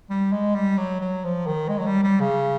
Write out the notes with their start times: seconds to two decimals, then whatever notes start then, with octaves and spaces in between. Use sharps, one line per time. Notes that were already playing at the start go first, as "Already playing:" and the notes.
0.10 G3
0.32 G#3
0.55 G3
0.78 F#3
1.01 F#3
1.24 F3
1.47 D#3
1.69 G#3
1.79 F#3
1.86 G3
2.03 G3
2.20 C#3